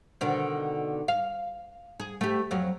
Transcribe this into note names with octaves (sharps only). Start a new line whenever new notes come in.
B2 D3 D#3
F5
G#4
A3 G4
F2 F#3